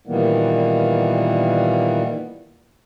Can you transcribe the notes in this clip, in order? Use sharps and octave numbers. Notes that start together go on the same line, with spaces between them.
A#2 D#3 E3 G3 A#3 B3